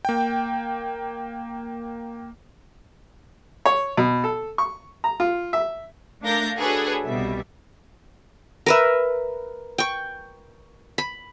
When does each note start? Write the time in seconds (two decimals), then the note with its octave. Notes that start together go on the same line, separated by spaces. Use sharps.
0.05 A#3 G5
3.66 C#5
3.97 B2
4.24 A4
4.58 C#6
5.04 A#5
5.20 F4
5.53 E5
6.22 A3 D4 A#4 F5 G6 A#6
6.57 D4 F#4 G#4 A4 B4 C#5
7.04 C2 B2 G3 E5
8.66 A#4 B4 E5
9.78 G5 C#6
10.98 B5